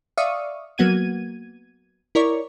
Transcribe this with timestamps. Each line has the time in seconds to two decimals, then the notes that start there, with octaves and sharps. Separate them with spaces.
0.18 D5 E5 F5 C#6 D#6
0.78 F#3 A#3 B3 F#4 G#6 D#7
2.15 E4 A#4 C#5 D5 C#6